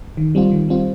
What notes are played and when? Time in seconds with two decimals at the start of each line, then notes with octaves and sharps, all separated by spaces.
0.17 D#3
0.35 G3 C4 F4
0.51 D#3
0.69 G3 C4 F4